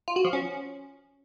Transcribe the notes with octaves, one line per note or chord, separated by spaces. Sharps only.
F4
F#4
F3
C#4